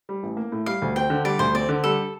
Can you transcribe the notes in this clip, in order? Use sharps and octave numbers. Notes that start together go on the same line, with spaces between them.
G3
A1
A#3
A2
G3 F5
D2
C4 G5
D3
G3 D5
D2 C5
C4 D5
D3
G3 A4